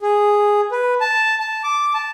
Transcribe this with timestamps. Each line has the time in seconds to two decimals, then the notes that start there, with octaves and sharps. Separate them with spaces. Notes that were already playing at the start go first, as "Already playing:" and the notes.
0.02 G#4
0.71 B4
1.01 A5
1.40 A5
1.64 D6
1.94 A5